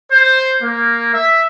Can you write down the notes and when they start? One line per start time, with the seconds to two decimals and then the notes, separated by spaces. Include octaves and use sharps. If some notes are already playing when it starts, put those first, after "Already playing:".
0.11 C5
0.62 A#3
1.13 E5